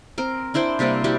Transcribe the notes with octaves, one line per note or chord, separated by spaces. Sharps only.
C4 A#4
D4 E4 C5 G5
C3 G3 A#3 C4
G3 E4 F#4 G4